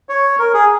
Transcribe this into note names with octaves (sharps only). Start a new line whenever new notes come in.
C#5
A#4
G#4